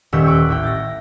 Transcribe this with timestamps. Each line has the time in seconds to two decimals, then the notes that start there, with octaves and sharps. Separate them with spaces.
0.13 D#1 A#2 C#6 E6 G6 B6
0.26 G5 C#6 D6 F#6
0.49 A1 E4 G5
0.63 A6 A#6